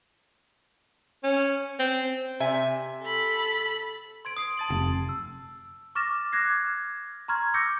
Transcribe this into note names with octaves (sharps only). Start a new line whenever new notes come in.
C#4
C4
C3 E5 G#5
A4 B5
C6 G#6 D7
D#6 C7 D7
A5 A6 F#7
F1
E6
C#6 D6 F6 A6 A#6 E7
D6 F6 F#6 G#6 A#6 C7
A#5 C6 C#6 F6 G#6
C#6 D6 E6 G6 A#6 C#7